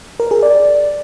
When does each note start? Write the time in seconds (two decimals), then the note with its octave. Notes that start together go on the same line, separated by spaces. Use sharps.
0.20 A#4
0.31 G#4
0.43 D5